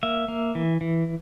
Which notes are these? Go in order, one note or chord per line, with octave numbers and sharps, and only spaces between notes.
A#3 E5
A#3
E3
E3